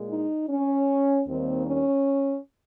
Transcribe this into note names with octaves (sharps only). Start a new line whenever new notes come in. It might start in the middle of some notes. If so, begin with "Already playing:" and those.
Already playing: A#2 G#3
D#4
C#4
D#2 D#3 G3 A#3 C4
C#4